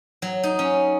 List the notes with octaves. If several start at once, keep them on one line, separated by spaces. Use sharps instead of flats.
F#3
D#4
C#4